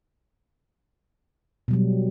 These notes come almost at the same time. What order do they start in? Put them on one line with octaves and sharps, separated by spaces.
B2 G3 F#3